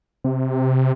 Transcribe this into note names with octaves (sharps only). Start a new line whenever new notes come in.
C3